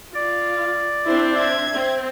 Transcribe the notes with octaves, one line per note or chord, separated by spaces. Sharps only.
F4 D5
C4 D4 E4 C5
E5 G#6
C4